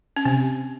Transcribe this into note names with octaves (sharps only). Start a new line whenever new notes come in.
C#4
C3 C4